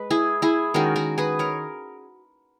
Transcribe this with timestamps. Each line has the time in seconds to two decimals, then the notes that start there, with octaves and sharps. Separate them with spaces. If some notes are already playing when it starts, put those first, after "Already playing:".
Already playing: G#3 B4
0.10 E4 G#4
0.42 E4 G#4
0.74 D#3 G#3 C#4 F#4 A#4
0.96 F#4 A#4
1.18 G#4 B4
1.39 A#4 C#5